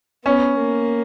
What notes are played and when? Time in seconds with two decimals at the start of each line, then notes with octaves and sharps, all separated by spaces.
0.25 B3 C#4
0.57 A#3